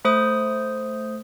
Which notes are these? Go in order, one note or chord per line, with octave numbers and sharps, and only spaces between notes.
A3 C5 D#6